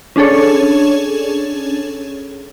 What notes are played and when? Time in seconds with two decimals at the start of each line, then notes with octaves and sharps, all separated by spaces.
0.16 C#4 D4 G#4 A4 C#5